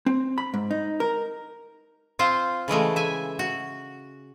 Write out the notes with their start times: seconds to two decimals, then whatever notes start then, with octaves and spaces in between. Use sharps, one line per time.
0.06 C4
0.38 B5
0.54 G#2
0.71 D#4
1.00 A#4
2.19 C4 F4 C5
2.68 C#3 E3 G#3 A3
2.96 E5 G#5
3.39 F#4